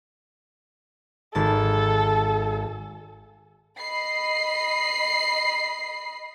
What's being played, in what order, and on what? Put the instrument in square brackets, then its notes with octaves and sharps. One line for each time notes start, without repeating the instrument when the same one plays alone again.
[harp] G#1 A5 [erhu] A4
[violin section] D#5 B5 C7